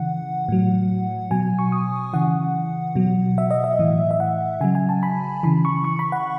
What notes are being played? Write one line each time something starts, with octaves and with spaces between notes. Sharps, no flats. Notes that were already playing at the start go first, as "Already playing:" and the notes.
Already playing: C#3 E3 F#5
A2 F#3
B2 F#3 G#5
C#6
D#6
C#3 E3 F#5
B2 F#3
E5
D#5
E5
A2 E3
E5
F#5
C#3 F#3 G#5
G#5
A5
B5
C#3 E3 B5
C#6
C#6
B5
F#5